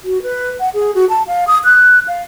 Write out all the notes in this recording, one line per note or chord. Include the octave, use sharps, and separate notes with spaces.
F#4
B4
F#5
G#4
F#4
A5
F5
D#6
F#6
F5